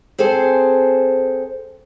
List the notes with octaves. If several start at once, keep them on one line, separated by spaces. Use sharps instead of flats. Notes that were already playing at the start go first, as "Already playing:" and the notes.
C4 G#4 A4 C5